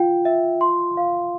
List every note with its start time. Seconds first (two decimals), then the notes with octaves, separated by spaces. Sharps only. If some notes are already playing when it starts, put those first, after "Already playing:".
Already playing: F4 G5
0.25 E5
0.61 C6
0.97 F5